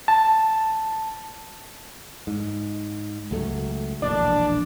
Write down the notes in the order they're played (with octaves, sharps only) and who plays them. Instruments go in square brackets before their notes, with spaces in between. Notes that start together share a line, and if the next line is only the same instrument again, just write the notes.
[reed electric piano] A5
[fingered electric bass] G#2
C#2 F#3 A3
[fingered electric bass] E1 A#1 [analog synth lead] D4